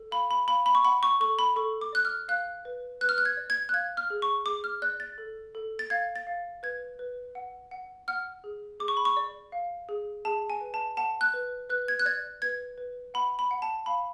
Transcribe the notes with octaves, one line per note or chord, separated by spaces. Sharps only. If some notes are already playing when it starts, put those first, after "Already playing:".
Already playing: A4
F5 B5
B5
F5 B5
B5
C#6
F#5 B5
C#6
A4 C#6
B5
A4 C#6
D6
D5 F#6
F6
F5 F#6
B4
B4 F#6
F6
F#6
G#6
D5
G#6
F#6
F5 G#6
F6
G#4
C#6
G#4 D6
F6
D5 F#6
A6
A4
A4
A6
F5 G#6
A6
F5
B4 G#6
B4
F#5
F#5
F#5 F6
G#4
G#4 D6
C#6
B5
C#6
D5
F5
G#4
G#4 A5
G#5
B4
A5
F#5 A5
F#6
B4
B4 F#6
G#6
F#6
D5 G#6
B4 G#6
B4
F#5 B5
B5
F#5
A5
F5 B5